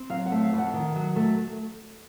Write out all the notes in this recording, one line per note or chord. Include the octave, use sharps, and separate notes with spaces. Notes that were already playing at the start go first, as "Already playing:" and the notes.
Already playing: C4
F#3 F5
F#5
A3
F5
F2
F#5
D#3
F#3
A3